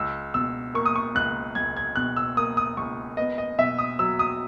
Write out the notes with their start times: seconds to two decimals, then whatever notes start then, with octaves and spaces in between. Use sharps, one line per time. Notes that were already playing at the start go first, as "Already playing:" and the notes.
Already playing: C#2 E6
0.34 B2 E6
0.74 A#3 C#6
0.86 D#6
0.96 C#6
1.15 C#2 F#6
1.55 C#2 G#6
1.77 G#6
1.96 B2 F#6
2.17 E6
2.37 A#3 D#6
2.57 D#6
2.77 C#2 C#6
3.17 B3 D#5
3.38 D#5
3.59 B2 E5
3.79 D#6
3.99 F#3 E6
4.19 D#6